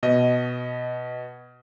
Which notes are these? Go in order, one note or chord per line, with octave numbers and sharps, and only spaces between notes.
B2 D#5